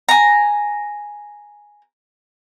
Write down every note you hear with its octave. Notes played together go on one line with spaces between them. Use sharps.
G#5 A#5